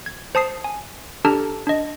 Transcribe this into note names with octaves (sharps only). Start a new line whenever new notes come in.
G#6
C5 A5 D#6 C7
G#5
D4 G4 A4 A5 A#5 F6
D4 D#5